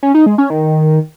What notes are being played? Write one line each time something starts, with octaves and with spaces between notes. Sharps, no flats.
C#4
D#4
G#3
C#4
D#3